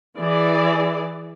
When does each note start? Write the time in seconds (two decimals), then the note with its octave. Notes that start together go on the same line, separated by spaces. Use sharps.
0.18 E3 G#4 D5